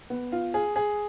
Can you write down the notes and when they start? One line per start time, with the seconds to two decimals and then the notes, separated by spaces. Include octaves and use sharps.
0.10 B3
0.32 F4
0.54 G#4
0.76 G#4